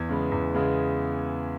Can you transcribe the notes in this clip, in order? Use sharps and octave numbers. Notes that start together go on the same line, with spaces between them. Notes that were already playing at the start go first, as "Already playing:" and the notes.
Already playing: E2 G#6
C#3 G#3 B3
E2
C#3 G#3 B3